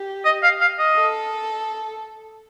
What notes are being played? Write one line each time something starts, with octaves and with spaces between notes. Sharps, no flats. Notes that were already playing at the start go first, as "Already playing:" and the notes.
Already playing: G4
D#5
F5
F5
D#5
A4